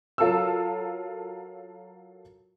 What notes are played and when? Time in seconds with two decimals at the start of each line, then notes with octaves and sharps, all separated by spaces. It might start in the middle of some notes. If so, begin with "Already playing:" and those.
0.18 F#3 F4 A4 A#4 A5 E6